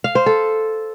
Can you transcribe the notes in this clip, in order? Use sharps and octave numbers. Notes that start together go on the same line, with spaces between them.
F5
C5
A4